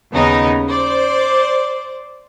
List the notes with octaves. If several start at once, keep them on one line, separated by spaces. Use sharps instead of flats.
D#2 C#3 B3 D#4
C5 D5